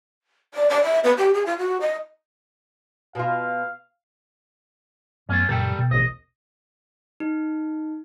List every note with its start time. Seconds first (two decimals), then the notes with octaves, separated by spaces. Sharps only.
0.54 D5
0.70 D5
0.83 E5
1.04 B3
1.17 G4
1.34 G#4
1.46 F4
1.58 F#4
1.81 D#5
3.15 B2 F4 F5
5.29 F#2 A3 B3 C#4 F4
5.49 F#2 A#2 C#3 G3 A4 A#4 G5
5.78 B2
5.91 A1 D2 D#5
7.20 D#4